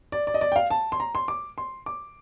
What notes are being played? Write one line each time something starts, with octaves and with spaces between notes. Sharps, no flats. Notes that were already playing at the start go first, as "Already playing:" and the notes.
D5
D5
D#5
D5
G5
F5
A5
C6
A#5
C6
D6
C6
D6